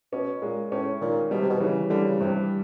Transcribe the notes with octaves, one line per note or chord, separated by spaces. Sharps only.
B2 C#4
A#2 G#3
A2 C#4
A#2 D#3
B2 G3
C3
B2
C#3 E3
D3 G3
C#3
G2 C3